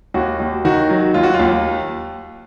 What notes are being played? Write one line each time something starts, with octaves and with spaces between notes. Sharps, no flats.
D#2 F#4
D#2
D#3 F#4
F#3
D#2 F4
F#4
F4
D#2